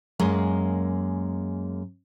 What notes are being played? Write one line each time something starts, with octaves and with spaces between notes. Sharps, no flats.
F#2 G#3 A#3